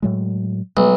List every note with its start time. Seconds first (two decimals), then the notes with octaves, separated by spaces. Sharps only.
0.02 A2 F#3 G#3
0.77 B1 G3 G#3